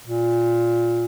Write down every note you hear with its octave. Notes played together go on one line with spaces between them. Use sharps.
A#2